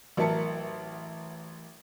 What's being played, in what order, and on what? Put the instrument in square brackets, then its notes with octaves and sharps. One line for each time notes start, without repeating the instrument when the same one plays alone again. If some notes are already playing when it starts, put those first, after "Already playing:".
[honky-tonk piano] A1 F#3 A#4 E5 A5 C#7